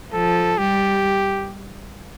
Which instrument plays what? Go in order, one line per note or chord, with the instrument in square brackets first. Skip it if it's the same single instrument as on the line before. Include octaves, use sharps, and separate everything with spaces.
[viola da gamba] F3 [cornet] A4
[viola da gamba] G3 [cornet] G4